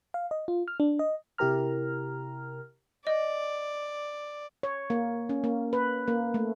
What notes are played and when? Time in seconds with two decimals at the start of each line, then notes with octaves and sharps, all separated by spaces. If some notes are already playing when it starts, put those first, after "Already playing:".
0.14 F5
0.31 D#5
0.48 F4
0.68 F6
0.80 D4
0.99 D#5
1.38 C3 E4 G4 A#4 A#5 F6
3.07 D5 D#5
4.63 C#5
4.90 A#3
5.29 C#4
5.44 A#3
5.73 B4
6.08 A#3
6.34 A3